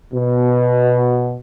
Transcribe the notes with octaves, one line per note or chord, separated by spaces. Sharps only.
B2